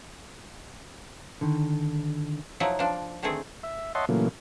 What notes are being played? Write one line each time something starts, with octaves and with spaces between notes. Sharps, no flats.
D3 D#3
F3 F#3 D#4 E4
F3 D4
D3 D#3 A3 C4 G#4
E5
C#5 D#5 E5 F#5 A5 C6
A#2 C#3 E3 F#3 A3 A#3